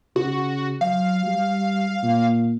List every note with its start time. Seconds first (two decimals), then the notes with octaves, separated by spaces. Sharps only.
0.16 C#3 F#4
0.81 F#3 F5
1.26 G3
2.03 A#2